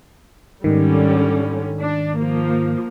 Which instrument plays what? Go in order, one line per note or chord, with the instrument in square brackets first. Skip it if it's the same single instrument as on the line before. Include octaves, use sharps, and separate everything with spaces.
[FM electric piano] G#2 D#3 [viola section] D3 G3 C#4
[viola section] D4
F3 A#3